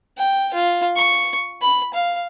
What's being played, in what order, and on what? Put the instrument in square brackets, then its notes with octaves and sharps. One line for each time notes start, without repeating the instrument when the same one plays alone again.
[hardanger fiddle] G5
F4
C#6
B5
F5